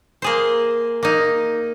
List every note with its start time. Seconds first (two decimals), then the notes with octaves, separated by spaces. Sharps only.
0.22 A#3 G#4 C5
1.03 A#3 D#4